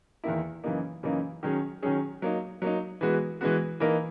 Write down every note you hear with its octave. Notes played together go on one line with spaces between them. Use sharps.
E2 D#3 A#3 E4
F#2 C#3 E3 A#3 D#4
F#2 C#3 E3 A#3 D#4
D#3 F#3 C#4 G#4
D#3 F#3 C#4 G#4
F#3 A#3 D#4
F#3 A#3 D#4
E3 G#3 B3 F#4
E3 G#3 B3 F#4
E3 A#3 D#4 A#4